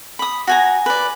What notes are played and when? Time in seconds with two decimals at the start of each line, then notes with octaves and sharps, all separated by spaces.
0.19 B5 D#6
0.47 F#4 G#5 A#5
0.86 B4 D5